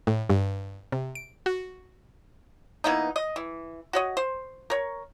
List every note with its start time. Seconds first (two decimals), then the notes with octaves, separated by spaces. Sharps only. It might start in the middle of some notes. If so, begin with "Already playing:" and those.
0.07 A2
0.30 G2
0.92 C3
1.15 D7
1.46 F#4
2.84 E3 A#3 B3 D#4
3.16 D#5
3.36 E3
3.93 F#4 C#5 D#5
4.17 C5
4.70 A#4 C#5